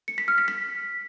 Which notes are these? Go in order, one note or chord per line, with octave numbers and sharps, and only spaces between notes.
C#7
B6
F6
B6
B6